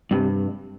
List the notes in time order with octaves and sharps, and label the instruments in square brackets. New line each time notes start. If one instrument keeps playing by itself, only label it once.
[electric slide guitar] G2 [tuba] C3